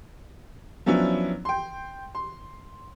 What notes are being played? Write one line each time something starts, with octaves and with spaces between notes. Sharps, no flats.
F3 F#3 B3 C#4 D4 E4
G5 C6
C6